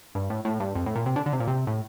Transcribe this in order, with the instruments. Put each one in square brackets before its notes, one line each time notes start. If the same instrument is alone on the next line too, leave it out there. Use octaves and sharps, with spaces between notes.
[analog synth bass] G2
A2
A2
G2
F2
A2
A#2
C3
D3
D3
C3
A#2
C3
A2